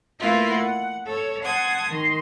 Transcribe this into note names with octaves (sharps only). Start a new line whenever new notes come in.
A3 A#3 E4 F4 B4
F#5
A4 C#5
F#5 A5 C6 D#6 G#6
D#3 C6